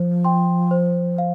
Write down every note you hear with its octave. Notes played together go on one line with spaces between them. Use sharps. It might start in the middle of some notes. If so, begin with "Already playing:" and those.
Already playing: F3 C5
G5 C6
C5
F5